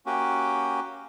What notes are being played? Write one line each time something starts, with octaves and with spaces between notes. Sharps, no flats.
A#3 C#4 F#4 G4